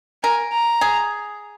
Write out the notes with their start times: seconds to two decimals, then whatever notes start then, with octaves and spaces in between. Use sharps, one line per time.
0.23 A#4 G#5
0.52 A#5
0.81 G#4